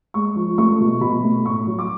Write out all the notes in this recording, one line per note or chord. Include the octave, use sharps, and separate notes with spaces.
G#3 C#6
F3
A3 C#6
B2
B2 B5
A3
A2 C#6
F#3
D6